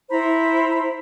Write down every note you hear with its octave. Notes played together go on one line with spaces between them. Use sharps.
E4 C5 A#5 B5